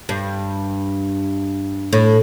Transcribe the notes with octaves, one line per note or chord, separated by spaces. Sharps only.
G2
A2